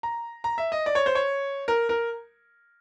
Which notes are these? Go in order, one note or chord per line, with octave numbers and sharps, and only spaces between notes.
A#5
A#5
E5
D#5
D5
C#5
C5
C#5
A#4
A#4